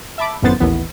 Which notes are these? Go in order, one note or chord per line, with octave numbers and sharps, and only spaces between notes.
E5 A5 B5 D6
G#1 F#2 A2 B3 C5 A6
A1 D#2 E3 B3